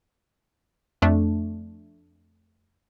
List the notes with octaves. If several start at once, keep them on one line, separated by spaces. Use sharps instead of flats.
F2 A3 D4